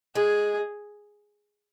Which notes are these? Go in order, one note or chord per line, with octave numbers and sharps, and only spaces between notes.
G#3 G#4